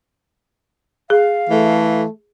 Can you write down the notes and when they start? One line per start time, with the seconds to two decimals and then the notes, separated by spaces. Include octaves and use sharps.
1.10 G#4 F5
1.49 E3 A3